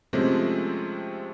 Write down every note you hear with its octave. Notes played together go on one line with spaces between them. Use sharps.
C3 F3 G#3 A3 C4 C#4